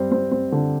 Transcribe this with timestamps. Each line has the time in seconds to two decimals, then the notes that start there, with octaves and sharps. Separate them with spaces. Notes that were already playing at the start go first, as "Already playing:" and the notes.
Already playing: G3 C4
0.12 C4
0.31 C4
0.52 D3